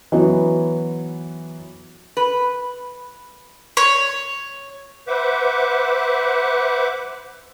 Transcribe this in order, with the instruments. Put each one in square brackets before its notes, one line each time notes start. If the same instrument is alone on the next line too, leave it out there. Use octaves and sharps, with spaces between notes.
[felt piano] E3 F#3 B3
[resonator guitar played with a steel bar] B4
[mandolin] C#5
[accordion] B4 C5 E5 F#5 D6